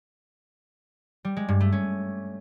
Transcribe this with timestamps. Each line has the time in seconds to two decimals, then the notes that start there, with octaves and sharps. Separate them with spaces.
1.25 G3
1.37 G#3
1.48 G2
1.60 A3
1.72 C#4